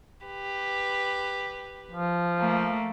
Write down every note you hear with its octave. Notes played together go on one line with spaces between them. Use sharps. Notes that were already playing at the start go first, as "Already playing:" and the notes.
G4 B4
F3
A3 A#3